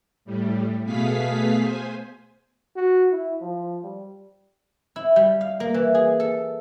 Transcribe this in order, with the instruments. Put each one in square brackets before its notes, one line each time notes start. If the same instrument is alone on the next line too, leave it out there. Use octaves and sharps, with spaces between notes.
[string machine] A2 G3
B2 A3 B3 G#4 F5 B6
C5 G#5
[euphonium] F#4
E4
F3
G3
[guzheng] E4
G3
F5
A#3
E3
G#4
A4